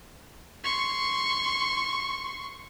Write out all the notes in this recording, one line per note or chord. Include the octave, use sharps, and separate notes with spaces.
C6 C#6